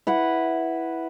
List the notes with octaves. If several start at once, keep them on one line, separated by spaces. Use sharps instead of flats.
E4 B4 F#5